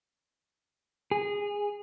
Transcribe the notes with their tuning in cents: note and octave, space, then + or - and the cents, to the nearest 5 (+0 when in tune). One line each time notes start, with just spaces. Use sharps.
G#4 -20